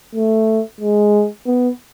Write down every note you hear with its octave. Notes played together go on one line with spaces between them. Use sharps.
A3
G#3
B3